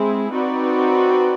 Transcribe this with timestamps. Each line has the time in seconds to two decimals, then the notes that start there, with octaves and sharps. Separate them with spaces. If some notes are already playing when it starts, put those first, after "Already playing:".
Already playing: G#3 C4 E4 G#4
0.32 C4 D#4 F#4 B4 D5